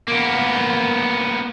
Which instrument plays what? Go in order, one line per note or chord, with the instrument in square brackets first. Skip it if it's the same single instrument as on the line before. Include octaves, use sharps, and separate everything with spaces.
[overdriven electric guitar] A#3 B3